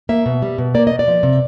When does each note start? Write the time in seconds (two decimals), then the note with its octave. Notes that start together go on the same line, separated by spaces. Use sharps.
0.09 A#3 E5
0.26 B2
0.42 G3
0.58 B2
0.74 A#3 D5
0.87 B2 D#5
0.99 D5
1.08 F3
1.23 C3